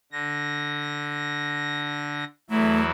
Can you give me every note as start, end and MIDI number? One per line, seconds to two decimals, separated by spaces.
0.12 2.24 50
0.12 2.24 94
2.50 2.91 40
2.50 2.91 54
2.50 2.81 57
2.50 2.91 64